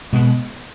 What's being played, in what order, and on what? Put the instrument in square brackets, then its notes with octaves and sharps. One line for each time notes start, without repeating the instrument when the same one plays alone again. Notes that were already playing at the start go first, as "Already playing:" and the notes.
[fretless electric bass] B2 G#3 B3